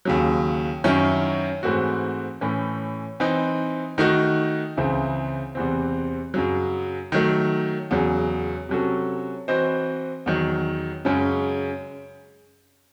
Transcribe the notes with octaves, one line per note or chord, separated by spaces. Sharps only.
D#2 C#3 F#3
F#2 D#3 F#3 C#4 E4
G#2 E3 A3 C4 F#4
A2 E3 A3 C#4
E3 C4 D#4
D#3 A3 D#4 F#4
C#2 C#3 E3 C4 E4
E2 C3 E3 C4
F#2 C#3 F#3
D#3 F#3 A3
E2 C#3 F#3
C3 F#3 C#4 F#4 A4
E3 C4 F#4 C5 D#5
E2 D#3 F#3
F#2 C#3 G#3 C#4